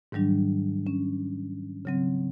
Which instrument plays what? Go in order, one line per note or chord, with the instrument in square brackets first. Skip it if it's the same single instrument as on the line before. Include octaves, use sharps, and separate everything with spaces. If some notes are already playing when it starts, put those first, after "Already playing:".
[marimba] G#2 D#3 F#3 G3 D4
C#4
C#3 F#3 C4